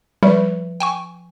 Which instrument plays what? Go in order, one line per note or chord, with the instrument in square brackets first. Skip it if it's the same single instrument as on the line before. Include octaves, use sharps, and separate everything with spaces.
[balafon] F3 B4 E5 [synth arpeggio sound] G3
[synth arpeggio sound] G5 G#5 C#6